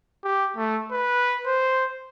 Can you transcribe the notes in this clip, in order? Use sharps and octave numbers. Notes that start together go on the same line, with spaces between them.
G4
A3
B4
C5